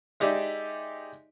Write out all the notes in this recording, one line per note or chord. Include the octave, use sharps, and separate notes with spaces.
G#3 D#4 G4 D5 E5